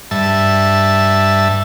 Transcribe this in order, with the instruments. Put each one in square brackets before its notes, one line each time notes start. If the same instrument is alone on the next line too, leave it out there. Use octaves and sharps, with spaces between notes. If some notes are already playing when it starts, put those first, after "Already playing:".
[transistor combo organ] G2 E5 A5